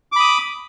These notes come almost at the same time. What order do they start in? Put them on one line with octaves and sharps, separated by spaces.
D6 B5 D#6